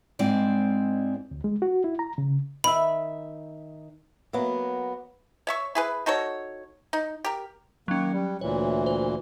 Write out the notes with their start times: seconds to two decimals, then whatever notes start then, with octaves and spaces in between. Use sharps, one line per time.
0.19 G#2 G#3 C4 E4 D5
1.31 D2
1.44 G#3
1.62 F#4
1.84 E4
1.99 A#5
2.18 C#3
2.64 D#3 E5 B5
4.33 F#3 A#3 B3
5.47 C#5 E5 C#6
5.75 E4 G#4 B4
6.06 D#4 F#4 A4 C#5
6.93 D#4
7.24 G4 A#4
7.88 D#3 F#3 A#3 C#4
8.12 G3
8.41 D2 A#2 E3 C#5
8.86 C5